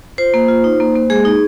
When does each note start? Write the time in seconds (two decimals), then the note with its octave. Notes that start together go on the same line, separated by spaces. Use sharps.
0.18 F4 C5
0.34 A#3
0.48 F4
0.64 D#4
0.80 A#3
0.95 A#3
1.10 G#3 G#4
1.25 D#4